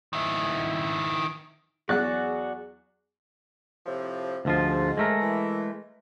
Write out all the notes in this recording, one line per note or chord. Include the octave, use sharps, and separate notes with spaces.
D#3 E4
E2 F#3 F#4 G#4 D5 F#5 F#6
A2 C3 F3
D2 G#2 F3 F4
G#3 A3 A#4
E3